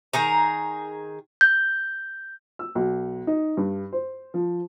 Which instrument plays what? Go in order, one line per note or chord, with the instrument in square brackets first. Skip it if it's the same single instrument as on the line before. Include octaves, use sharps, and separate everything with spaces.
[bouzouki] D#3 G#4 A#5
[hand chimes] G6
[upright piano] E6
B1
D#4
G2
C5
F3